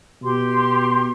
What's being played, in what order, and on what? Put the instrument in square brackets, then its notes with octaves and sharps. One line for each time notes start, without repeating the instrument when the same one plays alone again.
[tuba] B2 [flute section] G4 C6